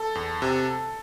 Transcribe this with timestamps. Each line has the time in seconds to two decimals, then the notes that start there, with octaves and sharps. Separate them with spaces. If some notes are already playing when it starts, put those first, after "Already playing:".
Already playing: A4
0.15 E2
0.42 C3